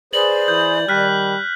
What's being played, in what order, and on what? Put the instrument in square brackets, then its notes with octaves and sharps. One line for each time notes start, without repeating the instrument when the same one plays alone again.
[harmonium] G#4 B4 C5 [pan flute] D5 [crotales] F#7
[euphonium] E3 [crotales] G6
[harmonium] D#3 [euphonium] G3 [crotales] F6 F#6 B6